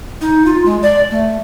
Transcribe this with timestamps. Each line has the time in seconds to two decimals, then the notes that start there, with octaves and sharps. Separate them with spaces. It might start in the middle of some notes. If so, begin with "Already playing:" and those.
0.21 D#4
0.46 F4
0.66 G#3
0.83 D5
1.11 A3